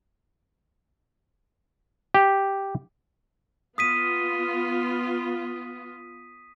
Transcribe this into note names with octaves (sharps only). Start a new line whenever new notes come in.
G4
B3 F4 D#6 B6 D#7